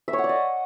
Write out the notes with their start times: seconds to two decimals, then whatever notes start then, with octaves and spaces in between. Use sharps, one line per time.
0.08 E5
0.13 C#5
0.18 F#5
0.24 D5
0.29 D#5